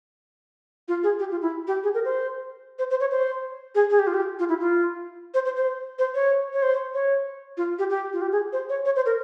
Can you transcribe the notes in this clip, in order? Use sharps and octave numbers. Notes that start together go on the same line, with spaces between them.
F4
G#4
G4
F4
E4
G4
G#4
A#4
C5
C5
C5
C#5
C5
G#4
G#4
G4
F4
G4
F4
E4
F4
C5
C5
C5
C5
C#5
C#5
C5
C#5
F4
G4
G4
F4
G4
G#4
C5
C#5
C#5
C5
A#4